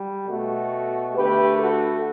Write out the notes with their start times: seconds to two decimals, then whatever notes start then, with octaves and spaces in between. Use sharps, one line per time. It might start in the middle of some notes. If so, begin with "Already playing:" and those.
Already playing: G3
0.27 B2 A3 F#4 A4
1.14 D3 A3 G4 B4
1.58 F#4 A4